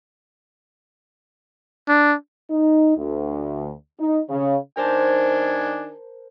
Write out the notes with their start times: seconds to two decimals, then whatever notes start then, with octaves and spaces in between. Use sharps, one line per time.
1.88 D4
2.51 D#4
2.97 D2
3.99 D#4
4.30 C#3
4.77 D#3 D4 A#4 C5 G#5 A5